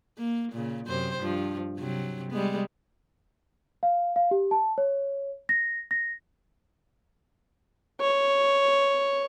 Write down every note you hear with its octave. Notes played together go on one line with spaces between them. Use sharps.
A#3
A#2 C#3
F#2 C3 C5
G2 F3
C3 F#3
G3 G#3 B3
F5
F5
G4
A5
C#5
A#6
A#6
C#5